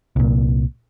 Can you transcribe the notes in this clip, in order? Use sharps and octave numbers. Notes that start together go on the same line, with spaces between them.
C2 A#2